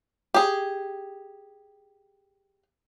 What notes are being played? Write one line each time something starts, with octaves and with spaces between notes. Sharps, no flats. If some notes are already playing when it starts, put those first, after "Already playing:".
G4 G#4